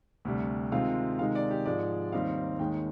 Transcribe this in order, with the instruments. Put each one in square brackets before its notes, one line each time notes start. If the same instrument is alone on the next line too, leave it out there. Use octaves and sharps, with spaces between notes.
[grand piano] D2 C3 G3
C3 D#3 G#3 C4 F4 F5
C3 D#3 G#3 D#4 F5
D5
G4
G#2 F3 G#3 D5
D#2 D#3 G3 C4 D#4 F5
D#2 D#3 G#3 G5